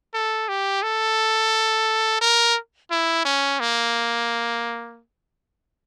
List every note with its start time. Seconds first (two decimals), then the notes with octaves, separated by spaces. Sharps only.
0.14 A4
0.48 G4
0.83 A4
2.21 A#4
2.91 E4
3.25 C#4
3.60 A#3